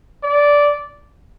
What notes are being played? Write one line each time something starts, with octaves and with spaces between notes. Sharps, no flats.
D5